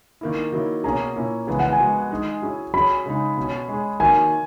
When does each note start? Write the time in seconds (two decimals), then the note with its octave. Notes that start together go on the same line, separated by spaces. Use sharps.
0.21 D#3 A#3 E4
0.52 D#3 F#3 A#3 E4
0.84 B2 A#3 C#4 G#4 A#5
1.16 A#2 A#3 C#4 E4
1.47 C#3 E3 G#3 B3 G#5
1.59 F#5
1.73 G#5
1.79 G#3 B3 F#4
2.10 G#3 D#4 G#4
2.42 F#3 C#4 E4 G#4
2.74 F#3 C#4 G#4 B5
3.06 C#3 G#3 D#4
3.37 B2 F#3 C#4
3.69 G#3 C#4 G#4
4.00 D#3 F#3 A#3 G#5